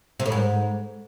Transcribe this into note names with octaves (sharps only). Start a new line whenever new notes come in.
C3
A2
G#2